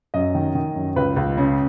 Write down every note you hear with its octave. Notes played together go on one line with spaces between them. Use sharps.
F#2 D#5
D#3
D#3
F#2
C#2 B4
C#2
C#3